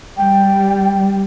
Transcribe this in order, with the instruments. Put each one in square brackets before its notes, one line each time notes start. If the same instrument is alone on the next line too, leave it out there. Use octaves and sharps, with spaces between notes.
[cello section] G3 [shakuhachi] G5